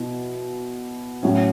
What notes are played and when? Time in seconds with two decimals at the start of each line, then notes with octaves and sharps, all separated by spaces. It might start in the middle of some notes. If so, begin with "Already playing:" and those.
Already playing: B2 B3 E4
1.23 A2 F#3 C#4